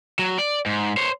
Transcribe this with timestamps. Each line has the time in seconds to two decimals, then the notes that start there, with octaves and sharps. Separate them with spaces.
0.19 F#3
0.38 D5
0.66 G#2
0.97 C5 C#5